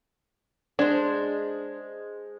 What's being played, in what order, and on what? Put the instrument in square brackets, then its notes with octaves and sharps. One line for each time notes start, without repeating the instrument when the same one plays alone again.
[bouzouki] G#3 C5 [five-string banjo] D4